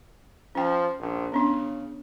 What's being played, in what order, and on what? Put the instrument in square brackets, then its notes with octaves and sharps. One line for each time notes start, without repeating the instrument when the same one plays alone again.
[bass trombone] F3 [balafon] C#4 G5
[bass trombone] A#1
[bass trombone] C#3 [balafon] B3 C#4 D4